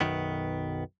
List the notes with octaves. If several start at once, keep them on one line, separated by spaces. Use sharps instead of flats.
B1 F#2 D#3 B3